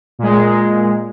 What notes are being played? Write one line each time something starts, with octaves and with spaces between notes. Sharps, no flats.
A#2 G#3